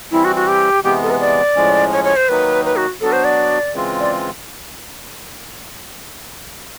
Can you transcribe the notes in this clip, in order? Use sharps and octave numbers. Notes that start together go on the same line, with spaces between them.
E3 G3 C4 E4
F#4
F#4
G4
C3 E3 G#3 B3 G4
A4
B4
D5
A2 F3 G#3 C#4
C#5
C#5
C5
D#3 F#3 A#3 D#4 B4
B4
F#4
F#3 B3 D4 F#4 A4
C5
D5
C#3 E3 G#3 C4 F4
D5